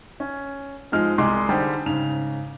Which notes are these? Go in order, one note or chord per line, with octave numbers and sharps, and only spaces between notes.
C#4
G#2 F3 G#3 F6
C2 G3 G#3 C6 D6
D3 G3 D#4 G4 G#4 C5
G#2 C#3 F7